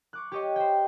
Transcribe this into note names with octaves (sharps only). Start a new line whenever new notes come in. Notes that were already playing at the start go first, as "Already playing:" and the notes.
C#6 D6 F#6
G4 C#5 D#5 G5 C#6
C5 G5